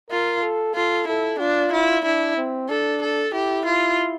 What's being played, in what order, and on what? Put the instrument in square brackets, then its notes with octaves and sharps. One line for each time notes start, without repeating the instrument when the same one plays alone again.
[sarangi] F4 [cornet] A#4
[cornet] A4
[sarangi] F4 [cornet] A4
[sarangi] E4 [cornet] A4
[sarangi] D4 [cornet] F4
[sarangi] E4
[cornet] D4 [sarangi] E4
[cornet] C4
[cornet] D4 [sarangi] A4
[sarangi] A4
[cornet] E4 [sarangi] G4
[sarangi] F4